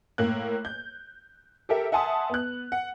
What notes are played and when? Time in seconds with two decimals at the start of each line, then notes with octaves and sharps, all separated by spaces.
0.18 A2 A#3 F#6
0.65 G6
1.69 G4 A4 A#4 E5
1.92 E5 F#5 G#5 A5 C6 D#6
2.30 B3 F#6
2.72 F#5